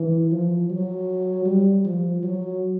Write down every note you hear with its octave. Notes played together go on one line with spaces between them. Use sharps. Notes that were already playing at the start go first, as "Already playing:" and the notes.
Already playing: E3
F3
F#3
G3
F3
F#3